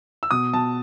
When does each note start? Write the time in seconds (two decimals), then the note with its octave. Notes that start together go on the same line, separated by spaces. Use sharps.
0.23 E6
0.31 B2 D#6
0.53 B2 A5